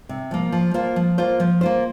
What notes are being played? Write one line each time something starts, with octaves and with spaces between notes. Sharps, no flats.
C3
F3 A#3
F3
A#3 F4 C5
F3
A#3 F4 C5
F3
A#3 F4 C5